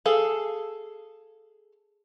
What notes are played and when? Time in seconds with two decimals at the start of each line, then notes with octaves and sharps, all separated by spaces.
0.06 G#4 A4 F5